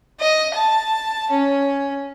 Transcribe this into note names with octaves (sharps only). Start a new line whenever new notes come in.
D#5
A5
C#4